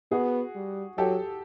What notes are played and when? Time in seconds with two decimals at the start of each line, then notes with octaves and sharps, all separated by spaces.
0.12 B3 F#4 G#4
0.55 G3
0.98 F#3 G4 A4